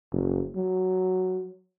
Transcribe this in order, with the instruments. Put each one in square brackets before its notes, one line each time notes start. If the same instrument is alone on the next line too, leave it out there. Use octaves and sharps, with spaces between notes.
[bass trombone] F#1
F#3